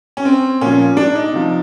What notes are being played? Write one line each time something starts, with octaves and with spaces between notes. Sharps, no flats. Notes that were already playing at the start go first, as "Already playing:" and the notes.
C#4
C4
A#2 F3 C#4
D4
D#4
C3 F3